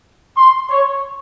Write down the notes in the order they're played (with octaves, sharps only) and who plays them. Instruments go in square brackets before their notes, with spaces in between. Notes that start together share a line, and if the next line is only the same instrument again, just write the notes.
[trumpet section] C6
C#5